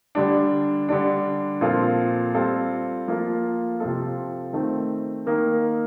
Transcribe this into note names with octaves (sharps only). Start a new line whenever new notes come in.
D3 G3 D4
D3 G3 D4
A#2 F3 C4 F4 A4
G3 C4 F4 A4
F3 A#3 F4 A4
C3 F3 C4 F4 A4
D#3 A3 C4
D#3 A#3 D#4 A#4